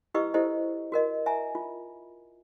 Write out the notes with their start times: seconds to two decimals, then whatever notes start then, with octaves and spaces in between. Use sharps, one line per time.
0.14 E4 G4 B4 D#5 C#6 E6
0.34 E4 G4 A4 C5 D#5
0.92 F#4 A#4 D#5
1.26 E5 G#5 A#5
1.55 F4